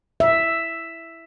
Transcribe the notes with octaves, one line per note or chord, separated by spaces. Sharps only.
E5